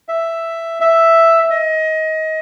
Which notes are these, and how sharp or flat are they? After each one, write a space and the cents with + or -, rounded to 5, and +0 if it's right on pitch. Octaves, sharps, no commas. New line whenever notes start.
E5 +5
E5 +5
D#5 +25